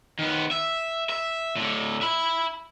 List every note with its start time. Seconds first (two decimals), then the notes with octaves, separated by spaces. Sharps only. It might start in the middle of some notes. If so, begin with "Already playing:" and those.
0.19 D#3 B3
0.51 E5
1.10 E5
1.56 A2 D3
2.01 E5 B5